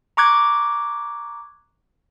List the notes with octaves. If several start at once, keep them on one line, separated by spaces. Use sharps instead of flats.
A#5 C#6 D6 F#6 G#6